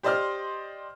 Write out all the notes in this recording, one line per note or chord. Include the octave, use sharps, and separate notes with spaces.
G4 C5 D5 D#5 C6 F6